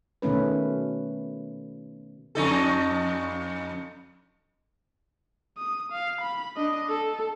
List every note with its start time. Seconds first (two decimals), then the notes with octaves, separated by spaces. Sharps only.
0.22 B2 D#3 A3 C#4 B4
2.35 F2 D#4 A4
5.57 D#6
5.92 F5
6.21 B5
6.57 D4 D#5
6.89 A4